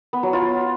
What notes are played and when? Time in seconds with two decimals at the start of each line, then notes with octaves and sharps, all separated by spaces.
0.13 B3
0.23 F#3
0.33 F4